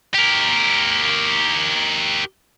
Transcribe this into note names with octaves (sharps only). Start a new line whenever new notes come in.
G4 A#4